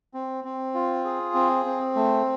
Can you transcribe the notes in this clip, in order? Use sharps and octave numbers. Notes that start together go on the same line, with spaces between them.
C4
C4
F4
G#4
C4
C4
A3